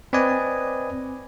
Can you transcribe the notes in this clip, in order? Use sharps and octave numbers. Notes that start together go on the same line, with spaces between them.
C4 B4 D5 D#5 G#5